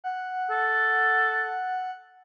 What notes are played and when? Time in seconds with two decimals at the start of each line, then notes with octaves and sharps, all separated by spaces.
0.04 F#5
0.51 A4